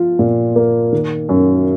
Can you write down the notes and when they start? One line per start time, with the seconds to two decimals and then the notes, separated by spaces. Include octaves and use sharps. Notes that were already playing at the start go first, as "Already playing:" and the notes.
Already playing: F3 F4
0.19 A#2
0.56 A#3
0.92 D#3
1.29 F#2